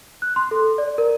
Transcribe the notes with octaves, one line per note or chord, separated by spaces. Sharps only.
F#6
C6
A4
D5
A#4